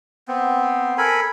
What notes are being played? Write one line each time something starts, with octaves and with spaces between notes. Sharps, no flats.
B3 C4
A4 A#4 G#5 B5